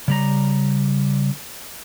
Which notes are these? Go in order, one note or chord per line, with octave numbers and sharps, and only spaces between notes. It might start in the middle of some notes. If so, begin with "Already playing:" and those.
C#3 G3 A#5